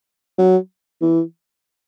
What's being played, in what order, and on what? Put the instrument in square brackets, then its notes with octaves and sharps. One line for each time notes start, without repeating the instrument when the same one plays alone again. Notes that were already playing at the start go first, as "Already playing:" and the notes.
[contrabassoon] F#3
E3